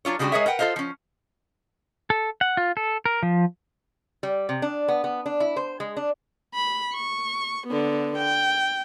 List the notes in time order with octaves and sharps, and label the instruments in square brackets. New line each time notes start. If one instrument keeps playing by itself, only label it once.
[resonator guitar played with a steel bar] F#3 D4 F4 C#5
C#3 G3 G#3 D4 F#4 G5
G#3 G#4 A#4 C#5 D#5 E5
A#4 B4 F#5 G5
F4 A4 C5 D#5 F5
F3 C#4
[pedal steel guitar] A4
F#5
F4
A4
A#4
F3
[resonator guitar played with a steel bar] G3
C3
D4
B3
B3
D4
E4
C5
G#3
D4
[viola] B5
C#6
D3 B3
G5